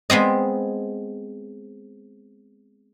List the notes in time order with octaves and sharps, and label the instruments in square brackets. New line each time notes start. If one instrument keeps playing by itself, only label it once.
[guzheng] G#3 B3 C4 D#5